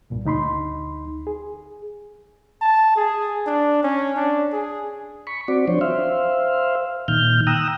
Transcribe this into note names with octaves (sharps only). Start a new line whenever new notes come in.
C2 G2 A#2
D2 D#4 B5 C6
G#4
A5
G#4
D4
C#4
D4
G#4
B5 C#6
C4 F#4 D5
F3 D4 C5 C#5
C5 E5 F5
A#2 D#3 F6 G6
G5 A#5 D#6 E6 F#6